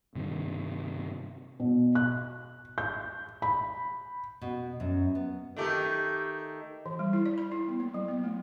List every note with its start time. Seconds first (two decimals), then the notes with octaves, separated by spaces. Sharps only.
0.15 G2 C3 D#3
1.60 B2
1.95 F#6
2.78 G6
3.42 B5
4.41 B2
4.80 F#2
5.15 B3
5.57 D#3 A3 G4
6.86 E3
6.99 G3
7.13 E4
7.26 D5
7.38 B5
7.52 E4
7.68 B3
7.80 A#3
7.94 F#3
8.08 B3
8.24 A3